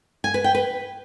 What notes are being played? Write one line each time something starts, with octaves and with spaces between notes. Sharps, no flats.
G#5
B4
G5
B4